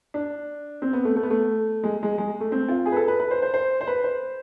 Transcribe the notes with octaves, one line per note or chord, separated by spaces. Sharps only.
D4
C4
B3
A3
A3
B3
A3
G#3
G#3
G#3
A3
C4
F4
G#4
B4
A4
B4
B4
C5
C5
C5
C5
B4
C5